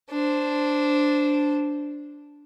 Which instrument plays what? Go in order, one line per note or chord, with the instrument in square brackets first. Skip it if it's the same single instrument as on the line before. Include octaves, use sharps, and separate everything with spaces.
[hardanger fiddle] D4 C5